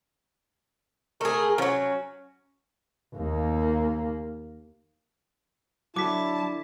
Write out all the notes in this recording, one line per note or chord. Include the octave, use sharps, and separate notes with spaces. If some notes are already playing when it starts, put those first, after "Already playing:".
A3 G#4 A#4
F3 F#3 C#4
D#2 A#3
D3 F#3 E4 A5 D6 B6